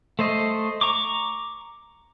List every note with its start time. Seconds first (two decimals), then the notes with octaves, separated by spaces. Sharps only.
0.19 A3 C5 D#5
0.81 A#5 C#6 D6